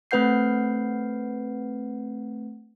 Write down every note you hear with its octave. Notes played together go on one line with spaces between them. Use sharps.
A3 C4 B4 F#5 G6 C7